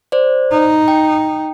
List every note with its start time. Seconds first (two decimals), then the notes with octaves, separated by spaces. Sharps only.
0.12 C5 D5
0.52 D#4
0.88 G5